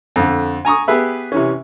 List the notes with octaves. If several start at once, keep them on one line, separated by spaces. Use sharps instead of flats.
F2 D3
G#5 A#5 C#6 D#6
B3 G4 G#4 B4 E5
C3 E3 C#4